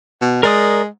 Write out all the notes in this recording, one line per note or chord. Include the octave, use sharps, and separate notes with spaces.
B2
G#3 A#4 D5 D#6